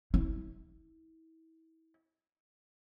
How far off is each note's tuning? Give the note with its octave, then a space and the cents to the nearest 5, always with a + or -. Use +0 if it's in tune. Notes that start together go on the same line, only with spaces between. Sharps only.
E4 -35